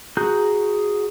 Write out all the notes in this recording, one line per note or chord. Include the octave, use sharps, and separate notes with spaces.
F#4 G#4 A#5 F#6 G6